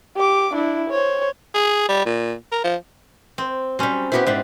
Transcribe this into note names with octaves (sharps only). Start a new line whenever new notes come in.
G4 D6
D4 E4
C5 C#5
G#4
G3
A#2
A#4
F3
C4
F#3 G3 C4 C#4
B3 E4 F#4 G4 C5
G#2 B3 C4 D4